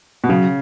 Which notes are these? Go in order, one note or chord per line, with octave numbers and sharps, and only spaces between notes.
B2
C#3 F#3